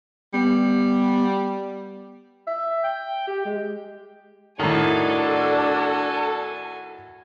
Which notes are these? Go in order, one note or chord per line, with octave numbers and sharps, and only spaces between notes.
G3 B3
E5
G5
G4
G#3
A2 D#3 D4 F#4 A4 G#5